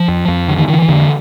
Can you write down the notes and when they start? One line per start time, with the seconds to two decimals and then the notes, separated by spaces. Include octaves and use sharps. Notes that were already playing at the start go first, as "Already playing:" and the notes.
Already playing: F3
0.08 F2
0.28 F2
0.48 D3
0.58 D#3
0.68 D3 E3
0.82 D#3
0.89 F2 D3